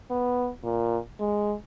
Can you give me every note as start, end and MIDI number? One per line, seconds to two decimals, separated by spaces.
0.10 0.50 59
0.64 0.98 46
1.20 1.55 56